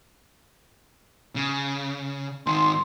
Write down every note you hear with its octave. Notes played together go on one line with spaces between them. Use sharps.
C#3
G#2 D#3 C6